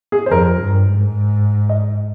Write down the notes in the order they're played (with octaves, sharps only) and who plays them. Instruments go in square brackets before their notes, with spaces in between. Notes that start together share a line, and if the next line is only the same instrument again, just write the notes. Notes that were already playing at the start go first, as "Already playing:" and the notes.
[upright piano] G#4
C5
[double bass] F2 [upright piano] A#4
[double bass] G2
G#2
[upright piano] D#5